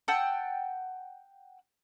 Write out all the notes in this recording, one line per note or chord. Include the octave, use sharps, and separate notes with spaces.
F#5 G5 A5 E6